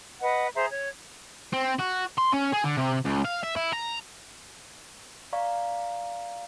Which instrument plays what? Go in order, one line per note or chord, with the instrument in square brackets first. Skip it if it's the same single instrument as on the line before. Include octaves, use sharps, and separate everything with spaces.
[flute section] B4 D#5 F#5
G#4 C5 E5 A#5
C#5
[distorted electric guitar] C4
F#4
C6
C#4
G#4
D3
C3
C#2
F5
E5
E4
A#5
[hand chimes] D5 F5 A#5 C#6